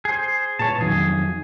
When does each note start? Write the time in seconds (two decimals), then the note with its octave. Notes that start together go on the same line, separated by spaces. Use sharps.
0.05 G#4 C5
0.59 A#2 G#4 B4 C#5 A5
0.81 F2 D#3 F#3 G#4